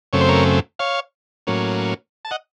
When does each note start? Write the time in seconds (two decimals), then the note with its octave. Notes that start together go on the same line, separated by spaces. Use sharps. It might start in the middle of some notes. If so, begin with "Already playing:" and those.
0.13 F#2 C#3 A3 C4 C#5
0.21 C5
0.29 A#4 C#5
0.79 C#5 F5
1.47 A2 F#3 A#3 C#4
2.25 A5
2.31 D#5 F#5